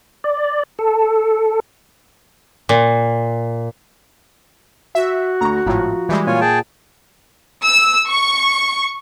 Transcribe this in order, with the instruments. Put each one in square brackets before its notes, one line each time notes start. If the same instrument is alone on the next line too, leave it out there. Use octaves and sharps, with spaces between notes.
[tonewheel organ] D5
A4
[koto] A#2
[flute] F#4 [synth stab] E5
[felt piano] D2 C#6 [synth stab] A#5
[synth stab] G#1 A2 [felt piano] F3 A#5
[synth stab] E3 G3 G#3
[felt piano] A#2 [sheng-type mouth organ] F4 C#5 G#5
[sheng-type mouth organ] G#4 G5 A5
[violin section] E6
C#6